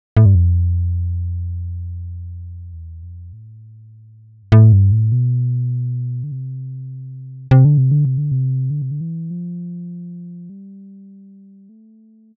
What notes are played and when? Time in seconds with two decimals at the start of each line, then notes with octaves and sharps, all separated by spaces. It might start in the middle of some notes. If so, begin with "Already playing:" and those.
0.17 A2
0.26 G2
0.35 F2
2.73 E2
3.03 F2
3.33 A2
4.43 G2
4.52 A2
4.73 G2
4.92 A2
5.12 B2
6.24 D3
6.32 C3
7.51 C3
7.65 D3
7.78 C3
7.92 D3
8.05 C3
8.18 D3
8.32 C3
8.70 D3
8.82 C3
8.91 D3
9.01 E3
9.31 F3
10.50 G3
11.69 A3